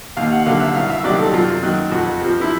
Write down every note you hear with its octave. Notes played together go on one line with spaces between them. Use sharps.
D#2 F5
F#5
D3 F#3 F5
E5
C2 F5
E5
C3 D#3 F#3 D5
A4
F#2 F4
D#3 F#3
F2 F#4
C3 F3
E4